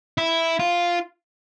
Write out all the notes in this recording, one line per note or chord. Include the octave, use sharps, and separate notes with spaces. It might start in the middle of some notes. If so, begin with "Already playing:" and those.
E4
F4